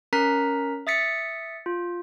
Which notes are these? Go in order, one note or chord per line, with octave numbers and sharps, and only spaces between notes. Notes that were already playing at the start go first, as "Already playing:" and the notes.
C#4 A#4 A#5 B6
E5 D#6 A6 B6 C#7
F4